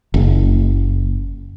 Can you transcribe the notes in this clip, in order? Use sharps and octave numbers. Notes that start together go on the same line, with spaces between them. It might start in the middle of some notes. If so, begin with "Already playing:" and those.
F#1